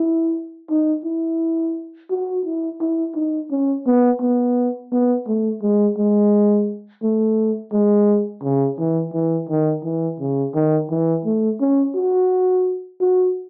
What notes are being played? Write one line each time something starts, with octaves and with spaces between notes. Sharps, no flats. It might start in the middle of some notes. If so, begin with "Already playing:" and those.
Already playing: E4
D#4
E4
F#4
E4
E4
D#4
C#4
B3
B3
B3
A3
G#3
G#3
A3
G#3
C#3
E3
E3
D#3
E3
C#3
D#3
E3
A3
C#4
F#4
F#4